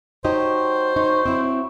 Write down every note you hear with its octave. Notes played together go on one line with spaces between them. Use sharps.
F#3 D#4 G4 C5 D5 D#5
D#4 C#5
C4 E4